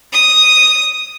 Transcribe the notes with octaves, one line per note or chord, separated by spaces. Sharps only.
D#6